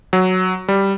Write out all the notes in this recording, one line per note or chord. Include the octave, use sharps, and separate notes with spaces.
F#3
G3